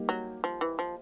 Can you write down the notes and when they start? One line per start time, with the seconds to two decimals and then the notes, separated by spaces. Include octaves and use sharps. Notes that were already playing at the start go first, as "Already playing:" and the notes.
Already playing: G3 A#3 D#4 G4
0.09 F#3
0.44 F3
0.61 E3
0.79 F3